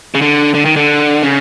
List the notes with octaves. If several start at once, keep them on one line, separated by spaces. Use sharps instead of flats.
C#3
D3
D3
D#3
D3
C#3